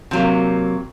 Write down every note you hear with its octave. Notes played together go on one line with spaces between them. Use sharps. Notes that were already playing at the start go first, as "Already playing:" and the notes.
C3 F#3 A#3